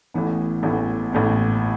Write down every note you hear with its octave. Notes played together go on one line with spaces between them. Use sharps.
A1 A2 E3 B3
A1 A2 E3 B3
A1 A2 E3 B3